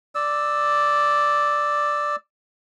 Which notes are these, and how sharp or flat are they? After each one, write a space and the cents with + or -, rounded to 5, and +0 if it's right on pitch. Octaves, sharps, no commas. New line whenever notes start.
D5 +0 E6 -5